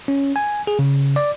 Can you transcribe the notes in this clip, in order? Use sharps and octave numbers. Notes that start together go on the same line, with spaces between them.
C#4
G#5
G#4
C#3
D5